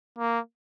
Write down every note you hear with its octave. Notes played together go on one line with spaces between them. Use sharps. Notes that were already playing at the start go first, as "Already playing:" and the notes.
A#3